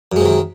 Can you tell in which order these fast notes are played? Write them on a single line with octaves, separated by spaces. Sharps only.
F#2 G#3 C3 D#3